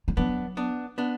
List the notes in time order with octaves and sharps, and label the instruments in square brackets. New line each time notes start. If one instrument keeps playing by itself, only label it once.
[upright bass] G3
[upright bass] F#3 [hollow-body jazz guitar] B3 D4
[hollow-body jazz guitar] B3 D4
B3 D4